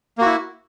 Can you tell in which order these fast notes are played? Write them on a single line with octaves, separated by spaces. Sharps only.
A#3 F#4 E4